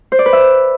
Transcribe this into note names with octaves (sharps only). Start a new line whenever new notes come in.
C5
D5
B4
E5